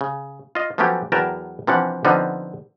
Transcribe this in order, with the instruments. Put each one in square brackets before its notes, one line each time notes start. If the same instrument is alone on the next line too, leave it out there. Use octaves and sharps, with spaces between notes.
[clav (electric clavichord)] C#3
F4 D#5
F3 F#3 A3 B3 C#4 G4
E2 F#3 A#4 B4 G5 A5
C3 E3 F3 C#4 D4 F#5
D3 F3 B3 C4 D#4